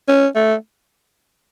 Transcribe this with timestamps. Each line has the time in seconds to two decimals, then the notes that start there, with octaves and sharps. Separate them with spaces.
0.08 C#4
0.35 A3